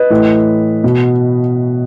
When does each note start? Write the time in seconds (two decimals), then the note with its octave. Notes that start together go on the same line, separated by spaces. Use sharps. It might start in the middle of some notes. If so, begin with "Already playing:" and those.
Already playing: B4 D#5
0.10 A2 E3
0.84 B2